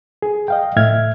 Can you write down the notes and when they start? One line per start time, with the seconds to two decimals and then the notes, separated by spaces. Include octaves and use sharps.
0.22 G#4
0.48 D#5 F5 G5
0.76 A2 E5 F6 G#6